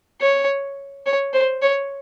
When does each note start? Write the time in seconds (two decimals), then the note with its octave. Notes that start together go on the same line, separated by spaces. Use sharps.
0.21 C#5
1.06 C#5
1.33 C5
1.62 C#5